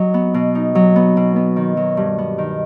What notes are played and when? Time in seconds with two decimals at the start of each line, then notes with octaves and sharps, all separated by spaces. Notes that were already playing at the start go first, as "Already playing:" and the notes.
Already playing: F#3 D#4
0.14 B3
0.34 B2
0.55 D#4
0.75 F#3
0.96 B3
1.17 B2
1.36 B3
1.56 D#3
1.77 F#3
1.97 G2
2.18 B3
2.38 D#3